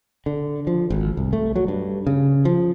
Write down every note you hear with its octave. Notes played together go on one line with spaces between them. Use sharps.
D3
F3
G#1
C2
A3
F#3
G2
C#3
F3